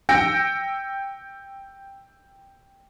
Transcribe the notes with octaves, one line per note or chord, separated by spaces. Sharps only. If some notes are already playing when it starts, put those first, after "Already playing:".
G5 E6 G6 A#6 C#7 D7